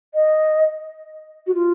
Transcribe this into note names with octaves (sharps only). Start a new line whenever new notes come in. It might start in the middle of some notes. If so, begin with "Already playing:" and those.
D#5
F#4
F4